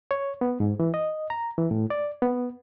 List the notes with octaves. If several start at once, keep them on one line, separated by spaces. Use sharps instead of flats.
C#5
B3
G#2
E3
D#5
A#5
E3
A2
D5
B3